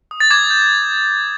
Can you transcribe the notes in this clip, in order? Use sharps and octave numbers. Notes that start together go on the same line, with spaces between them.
D#6
A6
D6 G#6
G6